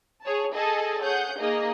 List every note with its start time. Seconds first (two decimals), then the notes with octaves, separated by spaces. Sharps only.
0.23 G#4 C#5 A5
0.54 G#4 A4 D#5 G#5 A5
1.03 G#4 C#5 F#5 G6
1.39 A#3 D#4 G#4 D#5